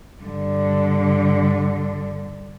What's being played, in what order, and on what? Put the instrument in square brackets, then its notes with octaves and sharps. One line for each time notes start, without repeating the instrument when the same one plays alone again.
[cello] G2 D3